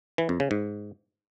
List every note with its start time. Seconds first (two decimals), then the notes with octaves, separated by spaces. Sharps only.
0.18 E3
0.29 F2
0.40 C#3
0.51 G#2